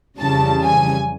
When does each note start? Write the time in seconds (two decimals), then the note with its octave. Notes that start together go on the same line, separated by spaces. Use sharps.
0.18 F2 C#3 E3 G3 A5
0.62 G#5